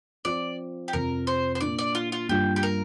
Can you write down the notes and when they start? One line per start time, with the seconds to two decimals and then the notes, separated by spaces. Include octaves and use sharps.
0.25 F3 C4 F4 D5
0.88 G4
0.93 F2 C3 F3 A#4
1.27 C5
1.55 C5
1.61 A#2 A#3 D4 D5
1.78 D5
1.95 F4
2.12 F4
2.29 G2 G3 A#3 D4 F4 G4
2.56 G4
2.63 A#4